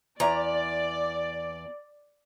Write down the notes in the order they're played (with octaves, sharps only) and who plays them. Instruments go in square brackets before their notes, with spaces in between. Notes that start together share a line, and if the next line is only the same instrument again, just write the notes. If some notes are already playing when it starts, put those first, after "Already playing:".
[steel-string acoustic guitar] E2 A#5 [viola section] D5